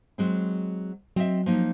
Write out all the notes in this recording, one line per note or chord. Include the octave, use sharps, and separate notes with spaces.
F#3 G#3 C4
F#3 C4 D#5 E5
F3 A#3 D#4